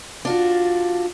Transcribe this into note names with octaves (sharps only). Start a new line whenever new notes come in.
D4 F4 F#4